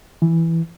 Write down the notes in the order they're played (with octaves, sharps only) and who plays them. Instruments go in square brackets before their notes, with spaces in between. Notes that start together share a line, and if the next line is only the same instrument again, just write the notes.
[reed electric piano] E3